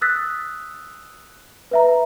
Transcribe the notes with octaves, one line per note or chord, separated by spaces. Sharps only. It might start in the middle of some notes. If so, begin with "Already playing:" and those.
D#6 E6 F#6 A6 B6
B4 E5 A#5